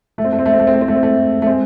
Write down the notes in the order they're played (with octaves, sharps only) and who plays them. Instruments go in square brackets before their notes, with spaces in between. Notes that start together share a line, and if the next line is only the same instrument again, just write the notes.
[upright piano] A3
C4
A3
C4
A3
C4
A3
C4
A3
C4
A3
C4
A3
A3
G#3 C4